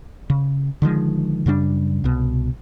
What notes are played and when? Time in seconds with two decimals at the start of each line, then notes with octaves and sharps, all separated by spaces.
0.30 C#3
0.82 D3 D#3 F3 G#3
1.46 F#2 C#3 G3 D4
2.04 C2 B2